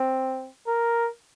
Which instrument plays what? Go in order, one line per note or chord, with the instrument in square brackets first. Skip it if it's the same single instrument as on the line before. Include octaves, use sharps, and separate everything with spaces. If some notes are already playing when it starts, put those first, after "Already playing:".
Already playing: [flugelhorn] C4
A#4